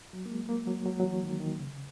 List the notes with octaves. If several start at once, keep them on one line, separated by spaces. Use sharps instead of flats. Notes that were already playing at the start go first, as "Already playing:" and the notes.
F#3
A#3
G#3
A#3
F#3
F#3
F#3
E3
D#3
D#3
C#3